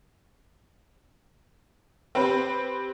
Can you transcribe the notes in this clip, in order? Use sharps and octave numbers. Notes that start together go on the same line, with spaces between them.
C4 G4 B4 C5